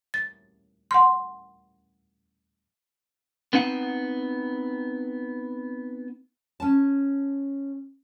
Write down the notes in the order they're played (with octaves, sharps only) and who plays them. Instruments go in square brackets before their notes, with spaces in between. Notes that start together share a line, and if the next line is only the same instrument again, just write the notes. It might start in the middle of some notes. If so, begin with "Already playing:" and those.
[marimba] A6
F#5 C6
[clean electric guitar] B3 C4 D#4 F#5
[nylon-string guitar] C#4 A5